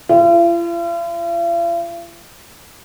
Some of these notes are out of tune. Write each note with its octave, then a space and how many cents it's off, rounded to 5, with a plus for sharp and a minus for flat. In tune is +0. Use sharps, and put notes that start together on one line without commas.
F4 -45